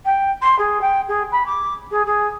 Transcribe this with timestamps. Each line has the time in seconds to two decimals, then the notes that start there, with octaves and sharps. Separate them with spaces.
0.05 G5
0.42 C6
0.58 G#4
0.81 G5
1.08 G#4
1.31 B5
1.46 D6
1.91 G#4
2.06 G#4